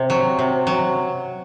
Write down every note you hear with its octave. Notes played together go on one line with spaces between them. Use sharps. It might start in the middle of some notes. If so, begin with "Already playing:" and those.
Already playing: C3
F#3
C3
F#3